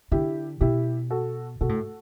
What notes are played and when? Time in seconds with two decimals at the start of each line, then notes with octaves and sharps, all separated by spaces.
0.11 D3 E4 G4
0.61 B2 E4 G4
1.10 F#4 A4
1.61 B2 F#4 A4
1.69 A2